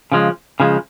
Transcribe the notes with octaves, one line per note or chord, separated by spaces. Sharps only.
C#3 F3 G#3
C#3 F3 G#3